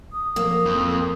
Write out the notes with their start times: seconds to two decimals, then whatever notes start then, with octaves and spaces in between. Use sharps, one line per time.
0.12 D#6
0.36 F3 A#3
0.65 F2